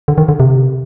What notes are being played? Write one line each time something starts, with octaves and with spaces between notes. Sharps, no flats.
D3
D#3
D3
C3